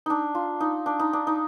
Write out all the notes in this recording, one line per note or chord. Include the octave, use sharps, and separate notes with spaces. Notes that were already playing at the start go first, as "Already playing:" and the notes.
D4 D#4
F4
D#4
D4
D#4
D4
D#4